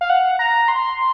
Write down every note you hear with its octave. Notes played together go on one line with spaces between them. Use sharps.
F5
F#5
A#5
C6